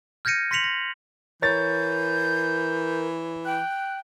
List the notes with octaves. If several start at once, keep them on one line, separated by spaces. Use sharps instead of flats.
F6 G6 G#6 A#6 C#7 D#7
C6 A#6 B6 C#7 F7 F#7
A#6
E3 A#4 C#5 G6 A6
G5 F#6